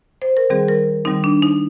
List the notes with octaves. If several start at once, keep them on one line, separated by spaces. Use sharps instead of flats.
C5
A#4
D#3 G3 C4 G#4
A#4
D#3 G3 C4 D#4
D4
D#4